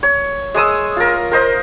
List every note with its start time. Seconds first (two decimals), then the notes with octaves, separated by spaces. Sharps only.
0.03 C#5
0.54 G#3 C#5 D#6 E6
0.96 F4 A#4
1.31 A#4 C5 D#5